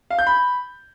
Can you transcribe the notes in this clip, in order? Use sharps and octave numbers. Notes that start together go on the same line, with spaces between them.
F5
G6
B5